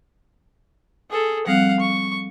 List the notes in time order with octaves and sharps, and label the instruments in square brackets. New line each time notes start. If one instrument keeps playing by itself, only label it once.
[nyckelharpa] G#4 A4
[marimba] F3 G3 C4 [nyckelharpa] F5 F#5
[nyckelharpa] C#6